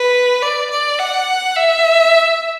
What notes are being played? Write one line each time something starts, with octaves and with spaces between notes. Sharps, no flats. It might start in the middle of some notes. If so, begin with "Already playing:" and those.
Already playing: B4
D5
D5
F#5
E5